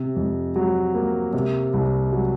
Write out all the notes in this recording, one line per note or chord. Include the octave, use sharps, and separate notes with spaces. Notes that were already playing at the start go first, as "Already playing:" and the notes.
Already playing: C3
F2
F#3
A#3
C3
C2
F#3